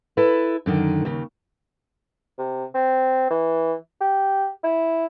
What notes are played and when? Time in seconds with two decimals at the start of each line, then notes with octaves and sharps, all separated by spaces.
0.17 E4 A4 B4
0.66 F#2 D3 D#3
1.05 D#2 C#3
2.38 C3
2.74 C4
3.30 E3
4.00 G4
4.64 E4